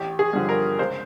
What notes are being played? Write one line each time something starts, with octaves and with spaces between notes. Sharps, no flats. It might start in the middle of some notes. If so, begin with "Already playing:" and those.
Already playing: A1 G4
G#4
G2 D3 F3
A#4
C#2 C5